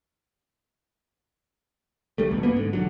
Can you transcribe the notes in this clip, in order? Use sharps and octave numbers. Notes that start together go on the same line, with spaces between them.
D2 G3 A3
D#1 C#2 B2
G1 A#3 B3
G#2 D3
E1 D3 F#3